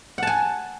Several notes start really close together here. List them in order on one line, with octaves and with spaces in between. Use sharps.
F#5 A5 G#5